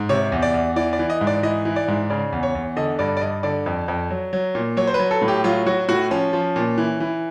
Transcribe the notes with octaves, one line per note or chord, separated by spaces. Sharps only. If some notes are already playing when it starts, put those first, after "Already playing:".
Already playing: G#2
C3 C#5
E2
D5
E2
E3 D5
D5
E3
D#5
G#2
D5
E3 D#5
E3
D5
G#2
C#3 D5
E2
C#5
E2
D3 D#5
G2 D5
D5
G2 D#5
D3 D5
F2
F2
F#3
F#3
A#2
F#3 C#5
C5
B4
F#3
A4
A2
G4
F#3 F4
F#3 F#4
A2 F#4
F3 C#4
F3
A#2
E3
E3